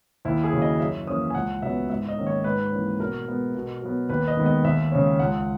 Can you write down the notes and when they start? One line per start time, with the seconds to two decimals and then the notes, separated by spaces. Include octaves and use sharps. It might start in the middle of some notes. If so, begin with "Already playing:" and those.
0.25 D#2 E4
0.44 G#4
0.53 C#3 F#3 A#3 C#4
0.62 D#5
0.80 F#2 E5
1.07 E3 A#3 C#4 D#6
1.30 G#5
1.35 C#2 F#5
1.62 C#3 F#3 B3 E5
1.90 G#2 E5
2.08 D#5
2.17 D#3 A#3 C#4
2.27 C#5
2.44 G#2 B4
2.72 E3 A#3 C#4
2.99 B2 A#4
3.27 G#3 B3
3.55 B2
3.82 F#3 B3
4.09 D#2 B4
4.28 D#5
4.37 D#3 G#3 B3
4.46 D#5
4.64 D#2 E5
4.92 C#3 G#3 C#4
5.19 C#2 F#5